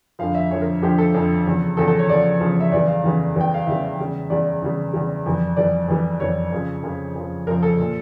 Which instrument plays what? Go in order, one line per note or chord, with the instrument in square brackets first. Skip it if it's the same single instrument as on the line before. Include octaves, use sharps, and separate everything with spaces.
[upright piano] F2 D3 F3 F5
E5
F2 D3 F3 C#5
A#4
F2 D3 F3 G4
A4
F2 D3 F3
E2 C#3 F3
E2 C#3 F3 A4
A4
C#5
E2 C#3 F3 D5
E2 C#3 F3
E5
E2 C#3 E3 G3 D5
F5
E2 C#3 E3 G3
E2 C#3 E3 G3 G5
F5
E2 C#3 E3 G3 E5
E2 C#3 G3
E2 C#3 G3 D5
E2 C#3 G3
E2 C#3 G3
F2 E3 G3
F2 E3 G3 D5
F2 E3 G3
F2 E3 G3 C#5
F2 C#3 F3
F2 C#3 F3
F2 C#3 F3
F2 C#3 F3 A#4
A4
A#2 F3